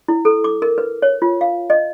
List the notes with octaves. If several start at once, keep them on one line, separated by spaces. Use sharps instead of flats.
E4
A4
D6
A#4
B4
C#5
F4
F5
D#5